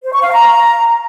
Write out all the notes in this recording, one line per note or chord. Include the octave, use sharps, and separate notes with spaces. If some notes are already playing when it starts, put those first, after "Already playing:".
C5
C#6
F5
A#5